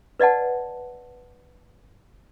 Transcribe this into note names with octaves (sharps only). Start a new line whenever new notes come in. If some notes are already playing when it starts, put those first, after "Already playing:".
B4 D5 D#5 F#5 A5